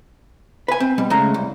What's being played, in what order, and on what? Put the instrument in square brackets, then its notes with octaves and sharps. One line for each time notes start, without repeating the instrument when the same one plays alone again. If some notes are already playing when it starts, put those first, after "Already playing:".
[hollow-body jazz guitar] B4 G#5
C4
B2 G3
C#3 G#3 A3 A#5
C2